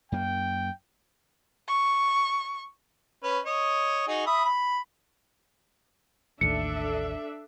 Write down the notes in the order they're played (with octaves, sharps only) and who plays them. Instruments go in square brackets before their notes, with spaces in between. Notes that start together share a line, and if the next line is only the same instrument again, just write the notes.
[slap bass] F#2 A#3 [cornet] G5
[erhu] C#6
[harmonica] C#4 B4
C#5 D#5
D#4 F#4 G#4
E5 B5 D#6
B5
[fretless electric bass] A1 D#2 [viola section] D4 A4 E5 [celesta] C#7